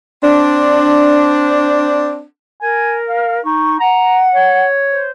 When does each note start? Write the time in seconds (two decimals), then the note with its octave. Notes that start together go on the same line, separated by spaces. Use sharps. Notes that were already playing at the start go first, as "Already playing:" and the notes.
0.23 C4 D4
2.61 A#4 G#5
3.08 F5
3.44 D#4 C#6
3.80 F#5 A#5
4.33 C#5
4.91 C5